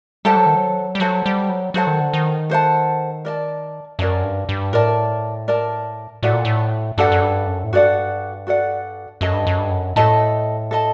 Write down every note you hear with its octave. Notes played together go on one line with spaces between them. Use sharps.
G3 A4 C5 F#5 A5
F#3
D#3
F#3
G3
F#3 A4 C5 F#5 A5
G3
F#3
F#3 A4 C5 F#5 A5
D#3
D3
D#3
A4 C5 F#5 A5
A#4 D5 A5
F#2 A#4 D5 A5
G2
G2
A2 A#4 D5 A5
A#4 D5 A5
A2 F#4 A4 D5 F#5
A#2
A2
G2 F#4 A4 D5 F#5
F#2
G2
F#2
A2
G2 F#4 A4 D5 F#5
F#4 A4 D5 F#5
F#2 A4 D#5 A5
G2
F#2
G2
F#2
A2 A4 D#5 A5
A4 D#5 A5